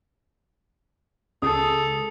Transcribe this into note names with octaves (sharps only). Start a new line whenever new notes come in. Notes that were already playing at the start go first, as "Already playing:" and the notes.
C#2 G#4 A4 D#6